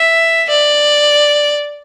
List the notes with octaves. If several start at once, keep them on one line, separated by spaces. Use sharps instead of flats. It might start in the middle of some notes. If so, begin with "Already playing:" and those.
Already playing: E5
D5